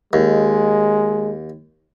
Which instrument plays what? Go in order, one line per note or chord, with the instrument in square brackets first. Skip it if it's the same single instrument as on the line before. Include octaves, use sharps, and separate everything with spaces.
[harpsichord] D#2 [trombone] G#3